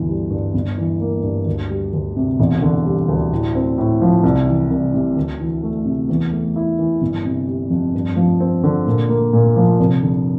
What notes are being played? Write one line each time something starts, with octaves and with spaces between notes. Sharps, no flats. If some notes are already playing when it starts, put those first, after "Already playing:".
Already playing: G1 D2 E3
G3
G2
G1
E3
A#3
G2
D2
G3
D2
C3
E1
D3
G3
D2
A2
C4
A2
F3
C2
E3
C2
C3
D2
E3
A3
C3
E2
A3
E4
E3
G1
C3
G3
F2
G2
F3
C4
D3
A#2
A#3
A#2
F3
F1
D3